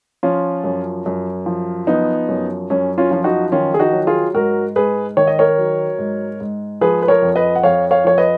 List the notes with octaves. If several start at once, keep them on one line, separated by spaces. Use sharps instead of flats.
F3 C#4 F4
F#2
F#2
F3
F3 B3 D#4
F#2
F#2 C#4
C#4 F4
F3 F4
D#4 F#4
D#3 C#4 F4
G#4
D#4 F#4
F#3
F4 G#4
G#2 F#4 A#4
G#2 G#4 B4
D#3 C#5
D#5
A#4 C#5
F#3
G#2
G#2
F3 G#4 B4
B4
A#4 C#5
F2
B4 D#5
F#5
F2 C#5 F5
C#5 F5
F3 C#5
B4 D#5